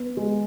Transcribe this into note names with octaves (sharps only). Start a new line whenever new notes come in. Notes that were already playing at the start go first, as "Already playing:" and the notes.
Already playing: B3
G#3